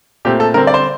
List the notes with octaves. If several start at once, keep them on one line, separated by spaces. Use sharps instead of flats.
A#2 A3 C4 G4
A4
D3 G3 C4 A#4
D5
C5